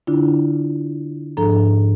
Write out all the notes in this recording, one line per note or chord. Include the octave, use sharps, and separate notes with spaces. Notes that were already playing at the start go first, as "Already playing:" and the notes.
D3 D4 E4 F4
G#2 F3 D4 A4 A#5